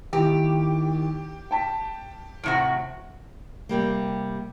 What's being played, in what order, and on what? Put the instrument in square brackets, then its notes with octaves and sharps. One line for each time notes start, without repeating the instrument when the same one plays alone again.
[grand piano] D#2 D#3 E4 [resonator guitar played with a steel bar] G4
[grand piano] G5 A5 B6
[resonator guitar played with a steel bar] A2 C3 F#4 [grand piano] C#7 D7
[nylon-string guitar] C3 G3 A#3